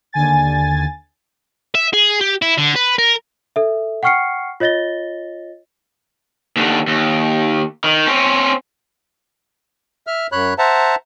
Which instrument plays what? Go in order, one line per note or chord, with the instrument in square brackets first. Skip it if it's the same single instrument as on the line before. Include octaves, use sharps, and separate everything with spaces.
[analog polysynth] D#2 D3 G#5 A6
[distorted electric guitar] E5
G#4
G4
E4
D3
B4
A#4
[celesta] A4 E5
F#5 G5 C#6 F6 C7 C#7
F4 C#5 D#5 A6 A#6 G7
[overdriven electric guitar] D#2 D3
D#2
D#3
C4 C#4
[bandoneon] E5 F6
F#2 C#5 B5 F#6
C5 E5 F#5 A5 A#5